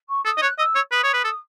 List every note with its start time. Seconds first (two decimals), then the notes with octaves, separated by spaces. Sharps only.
0.09 C#6
0.25 A4 D#6
0.38 D#5
0.42 C#5 F#6
0.58 D#5 E6
0.75 C#5
0.91 B4 D#6
1.03 C#5
1.13 B4
1.24 A4